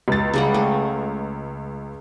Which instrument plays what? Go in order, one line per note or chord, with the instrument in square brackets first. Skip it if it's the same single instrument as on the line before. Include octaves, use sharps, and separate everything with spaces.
[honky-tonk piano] C#2 A6
[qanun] C#3 G3 F#5
A3